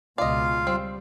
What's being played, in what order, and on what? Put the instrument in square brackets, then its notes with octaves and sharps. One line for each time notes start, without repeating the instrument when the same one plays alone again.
[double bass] C#2 B2 [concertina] F4 F5 [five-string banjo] D5 D#5
[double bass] G3 [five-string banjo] C4